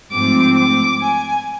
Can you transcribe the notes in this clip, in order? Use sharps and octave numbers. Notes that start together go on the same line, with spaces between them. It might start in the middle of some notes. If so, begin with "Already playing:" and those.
G#2 F3 A3 C4 D6
D6
G#5